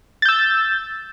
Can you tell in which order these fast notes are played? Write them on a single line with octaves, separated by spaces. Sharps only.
A6 G6 E6